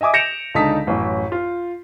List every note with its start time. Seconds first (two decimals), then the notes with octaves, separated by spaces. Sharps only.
0.01 D#5 E5 G#5 D6 D#6
0.14 G6 A#6 C#7 D7 E7 F7
0.55 C#2 D3 D#4 A5 D#6 B6
0.87 A1 F#2
1.32 F4